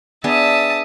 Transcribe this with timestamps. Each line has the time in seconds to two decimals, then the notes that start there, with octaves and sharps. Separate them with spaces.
0.24 B3 D4 G#4 E5 A5 D#6